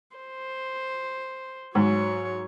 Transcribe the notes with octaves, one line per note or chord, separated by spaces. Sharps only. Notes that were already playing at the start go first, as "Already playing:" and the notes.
C5
G#2 F#3 C#5